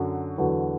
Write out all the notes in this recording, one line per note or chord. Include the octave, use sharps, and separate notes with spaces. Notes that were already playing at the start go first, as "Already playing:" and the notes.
Already playing: F#2 D3 F#3
E2 D3 F#3